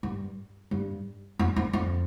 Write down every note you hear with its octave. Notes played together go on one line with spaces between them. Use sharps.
G2
G2
F2
F2
F2